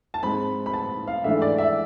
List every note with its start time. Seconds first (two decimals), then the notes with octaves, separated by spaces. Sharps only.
0.14 A5
0.23 G#2 G#3 C4 B5
0.66 B5
0.73 A5
1.08 F5
1.24 G#2 E3 A3 D4 E5
1.42 D5
1.58 E5